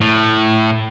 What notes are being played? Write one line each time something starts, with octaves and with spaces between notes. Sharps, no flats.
A2